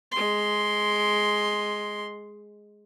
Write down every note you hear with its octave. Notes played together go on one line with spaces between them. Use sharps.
G#3 C6